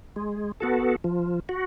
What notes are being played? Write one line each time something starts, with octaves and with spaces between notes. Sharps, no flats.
G#3
B3 F#4 A4
F3
F#4